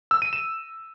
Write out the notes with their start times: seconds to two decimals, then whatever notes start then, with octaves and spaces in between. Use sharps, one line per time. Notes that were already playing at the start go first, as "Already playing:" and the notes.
0.11 E6
0.22 D#7
0.33 E7